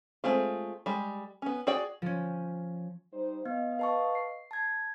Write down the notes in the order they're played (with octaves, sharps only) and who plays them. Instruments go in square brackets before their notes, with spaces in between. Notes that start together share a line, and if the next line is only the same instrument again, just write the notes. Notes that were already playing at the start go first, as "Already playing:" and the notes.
[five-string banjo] G#3 A3 C4 F4
G3 G#3
B3 C#4
F#4 G#4 D5 G5
[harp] F3 C#4
[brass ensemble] G3 D#4 C5
[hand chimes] B3 [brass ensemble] D#5 F5
[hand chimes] B4 A5 C#6
C7
A5 G#6